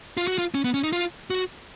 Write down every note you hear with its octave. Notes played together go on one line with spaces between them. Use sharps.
F4
F#4
F4
C#4
B3
C#4
D#4
F4
F#4